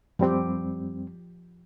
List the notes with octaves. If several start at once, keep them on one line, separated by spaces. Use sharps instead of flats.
F#2 F3 G3 C4 G4